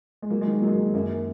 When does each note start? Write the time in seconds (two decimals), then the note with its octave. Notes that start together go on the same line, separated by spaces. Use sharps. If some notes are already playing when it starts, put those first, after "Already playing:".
0.22 G#3
0.30 F#3 A#3
0.41 G#3
0.46 D#3 A#3
0.62 F#3
0.67 G#3
0.72 A#3
0.78 D#3
0.94 F#2 A#3